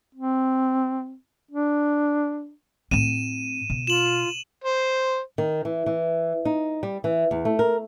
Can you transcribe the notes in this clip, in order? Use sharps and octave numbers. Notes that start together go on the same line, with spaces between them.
C4
D4
A2 C4 D#7 E7
B2
F4 E7 F#7
C5
D#3
E3
E3
D#4
G3
E3
E2
A3
A#4